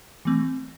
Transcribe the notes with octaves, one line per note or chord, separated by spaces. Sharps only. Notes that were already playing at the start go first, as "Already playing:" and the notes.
E3 A3 C4